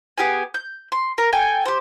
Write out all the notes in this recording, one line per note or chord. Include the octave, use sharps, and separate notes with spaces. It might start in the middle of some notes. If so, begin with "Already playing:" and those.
B3 G4 G#4 G#5
G6
C6
A#4
A4 G5 G#5
G4 C5